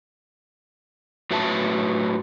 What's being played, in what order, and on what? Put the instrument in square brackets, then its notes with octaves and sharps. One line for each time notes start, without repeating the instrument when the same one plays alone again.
[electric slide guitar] A2 F#3 B4 E5 A5